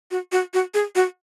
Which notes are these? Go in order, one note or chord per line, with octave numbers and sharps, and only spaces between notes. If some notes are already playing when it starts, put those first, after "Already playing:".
F#4
F#4
F#4
G#4
F#4